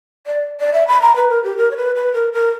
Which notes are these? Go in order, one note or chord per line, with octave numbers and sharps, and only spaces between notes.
D5
D5
E5
B5
A#5
B4
A#4
G4
A#4
C#5
B4
B4
A#4
A#4